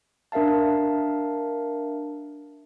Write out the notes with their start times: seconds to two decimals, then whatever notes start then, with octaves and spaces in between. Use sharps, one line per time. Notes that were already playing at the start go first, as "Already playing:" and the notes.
0.32 D4 A#4 E5 F5 A5